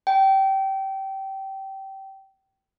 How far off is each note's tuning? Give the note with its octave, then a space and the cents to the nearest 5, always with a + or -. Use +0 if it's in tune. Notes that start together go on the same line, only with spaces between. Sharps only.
G5 -20